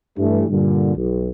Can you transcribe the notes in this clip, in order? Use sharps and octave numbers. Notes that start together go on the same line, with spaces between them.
G2 E3 G3 A3
G2 A#2 D3
B1